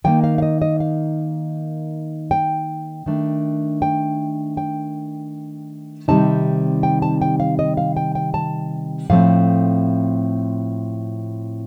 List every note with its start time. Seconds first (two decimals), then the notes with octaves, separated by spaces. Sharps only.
0.04 D#3 A#3 D#4 G5
0.24 F5
0.38 F5
0.42 D#5
0.62 D#5
0.80 F5
2.31 G5
3.06 D#3 A3 D4
3.82 G5
4.57 G5
6.08 C3 D#3 G3 C4 D#4 A5
6.83 G5
7.02 A5
7.22 G5
7.40 F5
7.59 D#5
7.77 F5
7.97 G5
8.15 G5
8.34 A5
9.10 A2 F3 A3 C4 F5